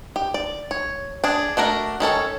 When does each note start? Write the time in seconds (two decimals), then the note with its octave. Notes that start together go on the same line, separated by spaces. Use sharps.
0.16 G4
0.34 D5
0.71 C#5
1.24 D4 G#4
1.57 A3 D4 F#4 A#4
2.00 D#3 C#4 A4 C#5